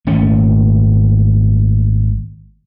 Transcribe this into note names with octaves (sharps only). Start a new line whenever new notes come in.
G#1 A#2 A3 C#4